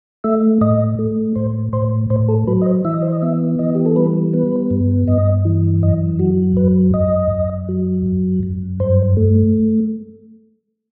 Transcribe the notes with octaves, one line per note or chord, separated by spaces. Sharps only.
A3 E5
A2 D#5
A3
A2 C5
A2 C5
A2 C5
A4
F#3 B4
D#5
C5
E3 E5
D#5
C5
D#5
B3 E5
E3 D#5
G4
A4
G3 B4
B3 B4
G2
G2 D#5
E3
F#2 D#5
F#3 F#4
F#2 B4
F#2 D#5
F#2
F#3
F#2
F#2
G2 C5
A3